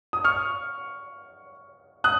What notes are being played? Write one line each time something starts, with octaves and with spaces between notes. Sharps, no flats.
D#6
C#6 F6
D#6 F#6